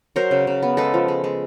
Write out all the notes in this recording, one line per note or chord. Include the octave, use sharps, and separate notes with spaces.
F#3 A#4 C5
C#3
C#3
B3
G#3 A4 B4
F3
G#3
G#3